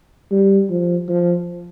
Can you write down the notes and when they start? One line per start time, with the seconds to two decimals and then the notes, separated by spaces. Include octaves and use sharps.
0.31 G3
0.70 F3
1.09 F3